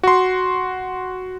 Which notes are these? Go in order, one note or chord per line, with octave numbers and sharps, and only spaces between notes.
F#4 C6